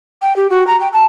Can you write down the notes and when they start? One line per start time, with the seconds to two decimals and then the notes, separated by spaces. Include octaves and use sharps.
0.22 G5
0.36 G4
0.50 F#4
0.67 A#5
0.80 G5
0.93 A5